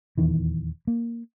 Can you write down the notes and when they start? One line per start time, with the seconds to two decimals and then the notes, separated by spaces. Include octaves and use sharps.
0.18 D#1 E2 D#3 E3
0.87 A#3